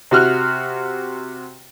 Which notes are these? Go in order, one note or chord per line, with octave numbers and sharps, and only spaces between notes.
C3 F#4 F6 F#6